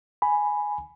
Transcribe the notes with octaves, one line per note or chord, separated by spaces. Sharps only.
G#5 B5